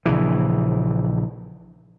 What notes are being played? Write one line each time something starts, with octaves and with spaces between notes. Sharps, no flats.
A#1 C#3 E3